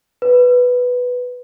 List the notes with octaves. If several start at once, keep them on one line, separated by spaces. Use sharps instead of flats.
B4